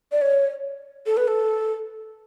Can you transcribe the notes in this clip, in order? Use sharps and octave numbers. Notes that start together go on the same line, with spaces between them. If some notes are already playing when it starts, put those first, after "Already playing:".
D5
C#5
A4
B4
A4